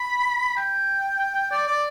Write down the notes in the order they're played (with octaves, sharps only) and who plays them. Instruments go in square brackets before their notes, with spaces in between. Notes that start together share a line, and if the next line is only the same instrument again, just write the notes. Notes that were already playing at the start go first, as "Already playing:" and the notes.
Already playing: [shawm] B5
G5
D5
D5